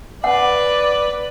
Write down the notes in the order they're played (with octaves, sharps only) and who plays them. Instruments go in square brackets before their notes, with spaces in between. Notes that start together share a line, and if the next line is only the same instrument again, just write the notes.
[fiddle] B4 [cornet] D5 [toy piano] F#5